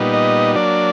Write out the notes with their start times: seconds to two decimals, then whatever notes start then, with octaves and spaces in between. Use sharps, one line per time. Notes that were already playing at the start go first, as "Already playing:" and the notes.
Already playing: A#2 G3 B3 D#4
0.13 D#5
0.55 F#3 A#3 D4 D5